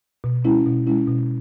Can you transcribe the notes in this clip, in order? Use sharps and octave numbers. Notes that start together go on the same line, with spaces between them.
B2
G#3 C#4 E4
B2
G#3 C#4 E4
B2